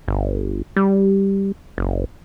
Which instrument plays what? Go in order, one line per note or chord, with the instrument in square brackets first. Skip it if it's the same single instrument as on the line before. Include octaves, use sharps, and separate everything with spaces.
[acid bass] G1
G3
F#1